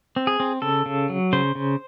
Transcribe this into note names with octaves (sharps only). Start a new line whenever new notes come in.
C4
G#4
C4
C#3 A4
C#3
F#3
C#3 C5
C#3